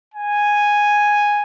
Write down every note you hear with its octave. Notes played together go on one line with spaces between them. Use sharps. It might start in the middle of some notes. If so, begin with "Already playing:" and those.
G#5